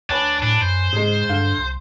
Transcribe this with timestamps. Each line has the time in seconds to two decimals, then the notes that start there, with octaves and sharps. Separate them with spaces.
0.09 D2 D4 B4 C#5 G#5
0.42 A2 D4
0.61 F#2 C5
0.93 G#2 C#3 G#3
1.29 G2 D3 F5
1.58 C2 C6